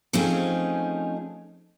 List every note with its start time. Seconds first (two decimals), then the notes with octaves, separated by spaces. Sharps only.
0.13 F3 A3 C4 C#4 D#4 G#4